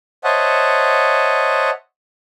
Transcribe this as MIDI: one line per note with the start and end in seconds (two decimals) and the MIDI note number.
0.24 1.70 72
0.24 1.70 73
0.24 1.70 75
0.24 1.70 76
0.24 1.70 78
0.24 1.70 81